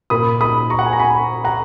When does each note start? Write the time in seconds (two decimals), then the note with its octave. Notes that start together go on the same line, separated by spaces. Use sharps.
0.10 A#2 A#3 B5 D#6
0.41 B5 D#6
0.70 A#5 C#6
0.79 F#5
0.86 G#5
0.93 A#5
0.99 G#5 B5
1.44 F#5 A#5